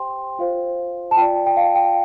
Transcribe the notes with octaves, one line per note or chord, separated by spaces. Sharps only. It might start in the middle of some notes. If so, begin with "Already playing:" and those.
Already playing: G4 C5 G5 C6
F4 C5 F5
A5
F4 D5 G5
G5
F5
G5